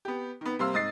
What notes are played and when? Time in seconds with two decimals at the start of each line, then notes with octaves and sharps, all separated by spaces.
0.05 B3 G4
0.41 D#3 B3
0.59 C3 G3 A#3 F5 C6 E6
0.73 G#2 D#5 D#6 A6 C7